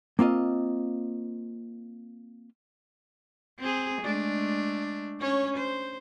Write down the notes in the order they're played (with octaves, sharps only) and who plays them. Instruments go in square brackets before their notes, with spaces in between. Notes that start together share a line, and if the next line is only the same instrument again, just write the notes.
[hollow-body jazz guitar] A#3 C4 F4 D#5
[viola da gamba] C4 G#4
G#3 A3 D4
C#4 C#5
C5